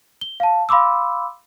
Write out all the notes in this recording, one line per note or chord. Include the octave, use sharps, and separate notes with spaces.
G7
F5 A5
F5 B5 C6 D6 E6